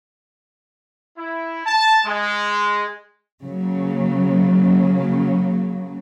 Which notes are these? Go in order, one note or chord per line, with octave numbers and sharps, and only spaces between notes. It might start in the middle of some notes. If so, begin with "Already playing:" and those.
E4
A5
G#3
C#3 F#3 A#3